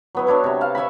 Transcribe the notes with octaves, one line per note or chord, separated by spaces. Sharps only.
F#3 B3 E4
F#3 D4 E4 C#5
C3 C#5
F5 A5
C#5 E5 G#5 B5